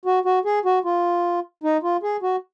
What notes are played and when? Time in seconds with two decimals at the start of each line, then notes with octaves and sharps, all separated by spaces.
0.05 F#4
0.25 F#4
0.45 G#4
0.65 F#4
0.84 F4
1.64 D#4
1.83 F4
2.03 G#4
2.22 F#4